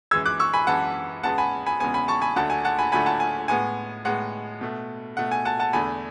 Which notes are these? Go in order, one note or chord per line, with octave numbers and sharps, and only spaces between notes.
F#2 E3 G#3 E6 G#6
D6 F#6
C#6 E6
G#5 B5
F#2 E3 G#3 F#5 A5
E2 C#3 G#3 B3 F#5 A5
G#5 B5
G#5 B5
E2 C#3 G#3 B3 G#5
G#5 B5
A5 C#6
G#5 B5
D2 D3 F#3 A3 F#5 A5
G#5
F#5 A5
G#5 B5
D2 D3 F#3 A3 G#5 B5
F#5 A5
G#5
A2 G#3 B3 G#5
A2 G#3 B3 F#5
B2 A3
B2 A3 F#5
G#5
F#5 A5
F#5 A5
E2 D3 A3 G#5 B5